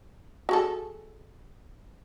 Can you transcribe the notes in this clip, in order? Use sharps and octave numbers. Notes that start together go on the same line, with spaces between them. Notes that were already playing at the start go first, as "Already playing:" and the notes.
F#4 G#4 A4